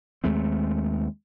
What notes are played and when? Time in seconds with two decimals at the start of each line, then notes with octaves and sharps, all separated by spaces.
0.24 D#2 G#3 A3 C4